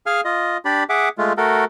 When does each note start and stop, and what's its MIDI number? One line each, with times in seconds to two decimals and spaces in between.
0.06 0.21 68
0.06 0.21 77
0.06 0.21 80
0.06 0.21 89
0.25 0.57 65
0.25 0.57 75
0.65 0.84 62
0.65 0.84 67
0.65 0.84 74
0.65 0.84 83
0.89 1.09 68
0.89 1.09 76
0.89 1.09 78
0.89 1.09 86
1.18 1.33 56
1.18 1.33 57
1.18 1.33 65
1.37 1.65 57
1.37 1.65 66
1.37 1.65 69
1.37 1.65 70